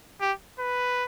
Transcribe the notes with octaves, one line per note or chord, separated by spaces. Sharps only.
G4
B4